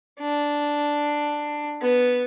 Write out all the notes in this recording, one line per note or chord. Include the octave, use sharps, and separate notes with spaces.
D4
B3